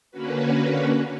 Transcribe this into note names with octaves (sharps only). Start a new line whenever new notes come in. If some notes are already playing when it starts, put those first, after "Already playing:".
D3 A#3 C#4 F#4 B4